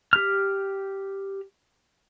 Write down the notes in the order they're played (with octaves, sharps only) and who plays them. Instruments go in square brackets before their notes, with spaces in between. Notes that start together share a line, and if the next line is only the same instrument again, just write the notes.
[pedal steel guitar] G4 F6